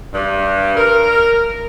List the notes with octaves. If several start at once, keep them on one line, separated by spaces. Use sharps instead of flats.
G2
A#4